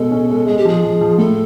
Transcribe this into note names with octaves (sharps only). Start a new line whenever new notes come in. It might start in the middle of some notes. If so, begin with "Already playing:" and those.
Already playing: B2 G#3 A4
C#4
G#3
G#3 G#4
G4
F3 G#4
F3
F3
A2 A4